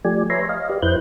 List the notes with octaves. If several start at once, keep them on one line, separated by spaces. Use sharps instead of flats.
F3 A3 G4 D5 G#5
B4 C#5 E5 G#5 A#5 C6
D#5 F5
G4 B4 D5
F2 E4 B4 C5 F#6 G6